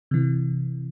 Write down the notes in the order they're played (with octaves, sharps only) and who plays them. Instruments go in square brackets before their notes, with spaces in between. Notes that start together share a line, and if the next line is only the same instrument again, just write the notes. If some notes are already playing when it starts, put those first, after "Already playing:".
[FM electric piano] C3 E3